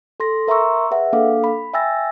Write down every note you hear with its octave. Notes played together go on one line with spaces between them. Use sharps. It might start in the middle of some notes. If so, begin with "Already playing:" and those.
A4 C6 A#6
A#4 E5 A#5 C6 C#6 E6
G#4 B4 E5 F#5
A#3 D4 A4 F5 D6
B5
E5 G5 G#5 E6 A6 A#6